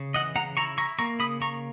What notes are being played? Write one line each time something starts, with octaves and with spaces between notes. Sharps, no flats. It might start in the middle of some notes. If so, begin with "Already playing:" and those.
Already playing: C#3
E3 D#5 F#5
C#3 F#5 A#5
E4 A#5 C#6
E4 A#5 C#6
A#3 A#5 C#6
C#3 B5 D#6
A#3 A#5 C#6